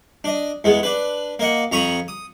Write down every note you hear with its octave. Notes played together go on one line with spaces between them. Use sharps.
D4 D#5
E2 G#3 B3
D4 B4
A#3 D#5 F#5
F2 A#5 B5 C#6 D#6
D#6